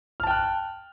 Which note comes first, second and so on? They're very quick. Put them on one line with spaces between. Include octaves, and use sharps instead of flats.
F6 A5 G5 F#6